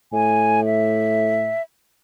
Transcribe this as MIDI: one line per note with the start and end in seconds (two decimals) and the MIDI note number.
0.13 1.53 45
0.13 0.64 80
0.65 1.62 76